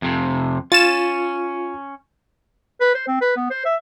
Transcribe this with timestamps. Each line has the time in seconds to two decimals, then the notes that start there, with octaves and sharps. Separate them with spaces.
0.02 F2 C3
0.72 C#4 F4 A6 E7
2.81 B4
2.95 C5
3.08 C4
3.21 B4
3.37 B3
3.51 C5
3.65 E5